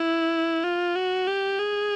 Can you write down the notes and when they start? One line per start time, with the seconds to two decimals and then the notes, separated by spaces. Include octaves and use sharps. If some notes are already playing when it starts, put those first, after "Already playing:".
Already playing: E4
0.64 F4
0.96 F#4
1.28 G4
1.60 G#4